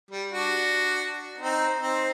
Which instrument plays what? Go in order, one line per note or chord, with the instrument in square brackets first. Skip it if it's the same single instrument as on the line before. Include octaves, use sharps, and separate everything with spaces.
[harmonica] G3
D4 F#4
C4 D#4
C4 D#4